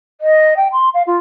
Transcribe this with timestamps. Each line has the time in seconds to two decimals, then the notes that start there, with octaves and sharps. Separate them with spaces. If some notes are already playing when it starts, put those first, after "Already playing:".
0.21 D#5
0.57 G5
0.73 C6
0.94 F5
1.07 F4